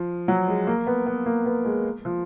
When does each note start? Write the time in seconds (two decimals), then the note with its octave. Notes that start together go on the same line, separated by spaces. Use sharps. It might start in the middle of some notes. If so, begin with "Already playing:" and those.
Already playing: F3
0.28 F#3
0.48 G#3
0.67 A#3
0.87 B3
1.06 B3
1.26 A#3
1.46 B3
1.65 G#3
2.05 F3